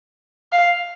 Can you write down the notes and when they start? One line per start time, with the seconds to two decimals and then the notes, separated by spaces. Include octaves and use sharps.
0.52 F5